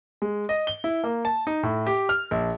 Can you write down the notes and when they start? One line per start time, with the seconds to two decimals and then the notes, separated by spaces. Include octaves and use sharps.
0.22 G#3
0.49 D#5
0.67 G7
0.84 E4
1.04 A#3
1.25 A5
1.47 D#4
1.63 A2
1.87 G4
2.09 F6
2.31 A#1